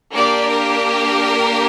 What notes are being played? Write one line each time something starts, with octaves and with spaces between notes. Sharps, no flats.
A#3 D4 G4 D5
A#4